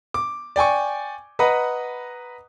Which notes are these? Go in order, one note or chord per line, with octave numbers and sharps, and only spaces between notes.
D6
D5 G5 G#5 C#6
B4 D#5 F#5 A#5 B5